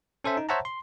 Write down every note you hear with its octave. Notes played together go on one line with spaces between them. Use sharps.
C#4 A4 C5 E5
D#4
C5 C#5 E5 F#5 A5 A#5
C6